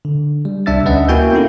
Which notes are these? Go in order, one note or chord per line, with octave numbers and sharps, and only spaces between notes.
D3
G3
C2 G3 D4 E5 E6 A6
D2 C#4 B4 D#5 E5 F#5
A#3 E4 F#4 G5 G#5 G6
A#3 B3 C#4 D#4 E4 A4